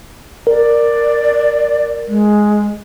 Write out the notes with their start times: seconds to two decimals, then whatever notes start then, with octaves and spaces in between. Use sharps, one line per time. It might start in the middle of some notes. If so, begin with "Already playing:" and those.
0.47 A#4 D5
2.08 G#3